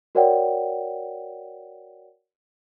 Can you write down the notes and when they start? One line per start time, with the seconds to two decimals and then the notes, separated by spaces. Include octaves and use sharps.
0.15 F#4 A#4 C#5 D5 F#5 G5